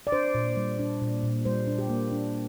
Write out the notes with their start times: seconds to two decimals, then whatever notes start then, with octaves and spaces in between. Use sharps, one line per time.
0.07 D5
0.12 D4 C5
0.35 A#2
0.57 G3
0.79 D4
1.01 A#2
1.23 A#2
1.45 G3 C5
1.67 D4
1.78 G4
1.89 A#3
2.12 D4